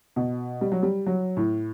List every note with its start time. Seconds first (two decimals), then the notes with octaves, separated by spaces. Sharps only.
0.16 B2
0.61 G3
0.72 F#3
0.83 G3
1.06 F#3
1.37 A2